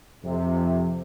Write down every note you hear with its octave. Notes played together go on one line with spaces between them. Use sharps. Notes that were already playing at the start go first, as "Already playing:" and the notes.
F2 C3